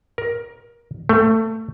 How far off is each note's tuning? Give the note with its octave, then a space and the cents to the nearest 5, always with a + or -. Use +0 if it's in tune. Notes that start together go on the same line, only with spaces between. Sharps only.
A#4 +20
A3 +20